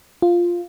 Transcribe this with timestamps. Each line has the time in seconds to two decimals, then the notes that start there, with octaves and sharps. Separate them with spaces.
0.22 F4